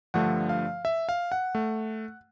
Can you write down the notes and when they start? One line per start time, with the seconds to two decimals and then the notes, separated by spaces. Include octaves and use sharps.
0.14 G2 D3 F3 A3 F#5
0.49 F5
0.85 E5
1.09 F5
1.32 F#5
1.55 A3